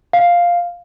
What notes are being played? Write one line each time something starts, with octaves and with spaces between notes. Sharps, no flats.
F5